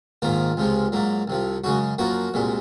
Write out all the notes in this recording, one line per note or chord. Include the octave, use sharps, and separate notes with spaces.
A#1 G#2 D#3 A#3 F4
C#2 C3 F3 G#3
G#2 F#3 A#3
C2 C3 F3
F#2 C#3 G#3 F#4
F#2 F3 A#3 F#4
C2 A#2 G#3